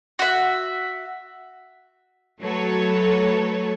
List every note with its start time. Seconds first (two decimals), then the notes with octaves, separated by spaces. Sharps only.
0.19 F#4 E5
2.41 F#3 A3 A4 B4 C#5